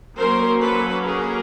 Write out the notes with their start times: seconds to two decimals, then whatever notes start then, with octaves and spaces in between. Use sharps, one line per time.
0.17 F#3 A#3 C#4 A#4 C5
0.61 A4 B4
1.05 G#4 A#4